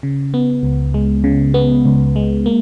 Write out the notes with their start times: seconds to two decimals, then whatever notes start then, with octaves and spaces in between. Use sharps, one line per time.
0.03 C#3
0.34 B3
0.63 C#2
0.94 G#3
1.24 C#3
1.54 B3
1.85 C#2
2.16 G#3
2.46 A#3